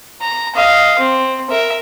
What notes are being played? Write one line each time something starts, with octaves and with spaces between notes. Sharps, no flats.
A#5
D#5 F5
C4
A#4 E5